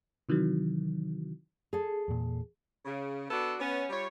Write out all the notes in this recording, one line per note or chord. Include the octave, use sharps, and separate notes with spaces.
C3 D#3 E3 F#3
G#4 A4
E2 A#2
C#3
B3 D4 F#4 A4
B3 C#4
G3 F4 C#5